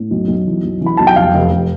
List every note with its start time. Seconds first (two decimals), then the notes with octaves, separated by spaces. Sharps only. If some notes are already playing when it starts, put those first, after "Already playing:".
Already playing: A2
0.11 B1
0.28 B1
0.47 E3
0.64 B1
0.81 E3
0.86 B5
0.97 B1 A5
1.07 G5
1.16 F1 F5
1.34 F1
1.52 F1